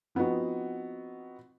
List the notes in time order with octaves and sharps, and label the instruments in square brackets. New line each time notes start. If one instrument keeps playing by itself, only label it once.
[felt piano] F3 B3 C4 D#4 F#4